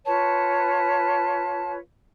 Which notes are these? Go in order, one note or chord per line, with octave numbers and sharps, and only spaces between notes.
F4 B4 C#5 A5